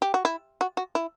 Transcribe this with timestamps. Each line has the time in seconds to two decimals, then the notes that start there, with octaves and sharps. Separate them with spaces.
0.02 G4
0.14 F#4
0.25 E4
0.61 F#4
0.77 F#4
0.95 E4